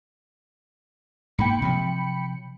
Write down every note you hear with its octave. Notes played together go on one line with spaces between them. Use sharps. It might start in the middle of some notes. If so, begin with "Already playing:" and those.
G#2 A#3 G5 B5 C#7
C3 F3 F#3